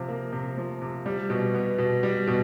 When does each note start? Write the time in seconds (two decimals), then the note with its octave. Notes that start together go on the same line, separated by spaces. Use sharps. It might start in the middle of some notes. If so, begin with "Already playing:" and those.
Already playing: C3 F3
0.09 A#3
0.33 C3
0.57 F3
0.82 C3
1.06 G3
1.30 B2
1.55 B3
1.78 B2
2.03 G3
2.27 B2